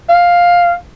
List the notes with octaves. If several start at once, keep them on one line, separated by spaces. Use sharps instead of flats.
F5